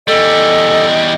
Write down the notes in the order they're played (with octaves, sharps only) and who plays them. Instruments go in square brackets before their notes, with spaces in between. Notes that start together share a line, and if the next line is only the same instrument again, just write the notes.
[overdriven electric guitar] E2 G3 [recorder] A4 [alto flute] D#5